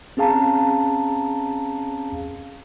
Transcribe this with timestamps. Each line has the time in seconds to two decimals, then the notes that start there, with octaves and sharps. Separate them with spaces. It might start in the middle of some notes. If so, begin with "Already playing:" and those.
0.17 C4 C#4 G#4 F5 A5 A#5